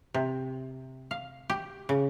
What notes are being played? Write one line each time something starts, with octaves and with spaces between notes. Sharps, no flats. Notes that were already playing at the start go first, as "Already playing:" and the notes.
C3
F5
G4
C#3